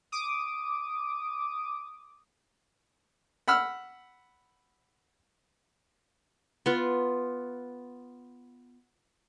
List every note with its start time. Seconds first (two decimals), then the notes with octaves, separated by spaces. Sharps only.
0.12 D6 D#6
3.48 F#5 B5 E6 F6
6.66 B3 F4